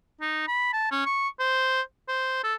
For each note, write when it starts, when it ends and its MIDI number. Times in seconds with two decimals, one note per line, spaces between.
0.21 0.47 63
0.48 0.70 83
0.73 0.91 81
0.92 1.03 61
1.06 1.28 85
1.39 1.81 72
2.08 2.41 72
2.44 2.54 69